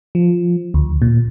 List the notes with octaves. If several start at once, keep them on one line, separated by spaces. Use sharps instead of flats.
F3
D2
A#2